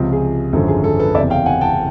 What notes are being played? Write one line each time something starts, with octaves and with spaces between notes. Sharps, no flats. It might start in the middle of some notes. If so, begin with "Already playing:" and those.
Already playing: C#2 C3 F3
G#4
G#1 F#2 D3 F3 A4
G#4
A4
A4 B4
F#1 E2 C3 D5 E5
F5 G5
F#5 G#5
G5 A5